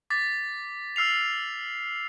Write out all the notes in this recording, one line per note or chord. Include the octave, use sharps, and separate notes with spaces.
D6 A6 B6
E6 F6 C7 F7